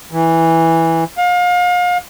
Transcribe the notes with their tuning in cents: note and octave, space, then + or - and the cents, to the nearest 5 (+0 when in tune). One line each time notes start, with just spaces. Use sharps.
E3 -5
F5 +35